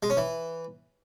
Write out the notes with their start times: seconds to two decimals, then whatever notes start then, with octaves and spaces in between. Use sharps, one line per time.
0.03 G#3
0.10 C#4
0.17 E3